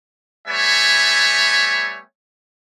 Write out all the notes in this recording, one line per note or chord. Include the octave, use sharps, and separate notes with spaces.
G3 A3 B3 C#5 E5 G#5